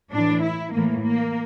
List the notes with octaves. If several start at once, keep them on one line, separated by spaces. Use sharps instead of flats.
A2 E3 D4
E4
A2 E3 A#3
A#3